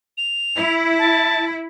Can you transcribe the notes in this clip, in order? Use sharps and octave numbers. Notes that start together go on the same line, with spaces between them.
F7
E4
A5